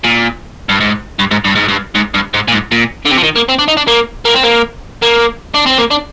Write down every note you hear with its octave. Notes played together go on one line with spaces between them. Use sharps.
A#2
G2
G#2
G2
G#2
G2
G#2
G2
G#2
G2
G#2
A#2
G#2
A#2
D3
C3
F3
D#3
A#3
C4
D4
D#4
D4
A#3
A#3
C4
A#3
A#3
D4
C4
A#3
D4